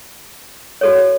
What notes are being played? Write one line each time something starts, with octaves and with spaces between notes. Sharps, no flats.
F#4 A4 C#5